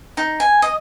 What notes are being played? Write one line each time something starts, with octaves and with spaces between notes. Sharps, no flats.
D#4
G#5
D#5